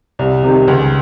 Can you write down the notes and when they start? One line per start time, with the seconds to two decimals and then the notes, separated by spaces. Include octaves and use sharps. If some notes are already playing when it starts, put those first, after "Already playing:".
0.19 C2
0.43 C3 D#3
0.68 C#2